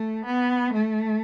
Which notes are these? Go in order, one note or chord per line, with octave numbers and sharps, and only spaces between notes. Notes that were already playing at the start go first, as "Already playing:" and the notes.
Already playing: A3
B3
A3